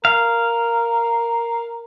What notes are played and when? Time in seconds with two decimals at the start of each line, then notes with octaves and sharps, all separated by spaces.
0.05 A#4 F5